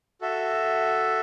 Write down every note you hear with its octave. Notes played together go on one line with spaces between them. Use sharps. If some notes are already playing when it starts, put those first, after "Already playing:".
F#4 A4 E5